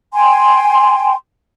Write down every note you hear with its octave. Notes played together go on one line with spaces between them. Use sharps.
G5 G#5 C6